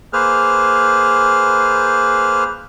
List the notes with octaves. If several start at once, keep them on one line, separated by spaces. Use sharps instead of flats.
A#3 G#4 B4 C5 F6